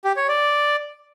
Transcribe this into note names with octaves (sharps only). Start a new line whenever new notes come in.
G4
C#5
D5